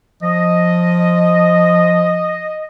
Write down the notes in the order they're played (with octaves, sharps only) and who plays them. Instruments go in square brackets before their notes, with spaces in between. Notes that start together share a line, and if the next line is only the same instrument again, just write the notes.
[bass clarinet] F3 [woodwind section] D#5